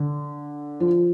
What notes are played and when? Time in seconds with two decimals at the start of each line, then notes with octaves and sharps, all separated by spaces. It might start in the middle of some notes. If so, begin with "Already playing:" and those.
Already playing: D3
0.80 F3